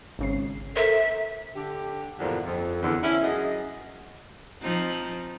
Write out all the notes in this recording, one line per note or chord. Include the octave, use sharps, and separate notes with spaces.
G#1 C#3 C7
A4 A#4 C5 E5
D3 G4
E2 G2 A#2 D3 F3
F2
E2 D3
C#4 D4 E4
F#2 G#4 D#5
F3 C4 D#4